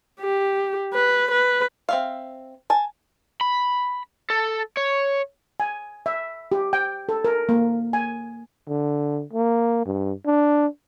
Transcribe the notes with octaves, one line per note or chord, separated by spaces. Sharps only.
G4
B4
B4
C4 E5 F5
G#5 A5
B5
A4
C#5
G#5
E5
G4
G5
A4
A#4
A#3
G#5
D3
A#3
G2
D4